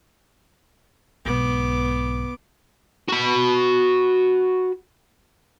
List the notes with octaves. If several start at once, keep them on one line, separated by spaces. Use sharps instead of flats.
B1 G#2 B3 D6
F#4 B5